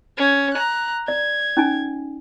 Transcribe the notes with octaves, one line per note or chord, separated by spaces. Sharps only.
C#4 G#6
A#5 F#6
D5 G#6
C#4 D#4 G#5